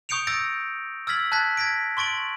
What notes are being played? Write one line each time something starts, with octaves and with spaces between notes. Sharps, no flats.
C#6 D#6 G6 C#7 D7 F7
D#6 E6 G6 A6 A#6 D7
E6 F6 G#6 A6 B6 F#7
A5 F#6 G#6 A6 B6
G#6 A#6 B6 D7
C6 C#6 A6 D7 F#7